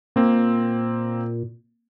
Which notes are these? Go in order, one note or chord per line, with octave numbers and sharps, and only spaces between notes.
A#2 A#3 C4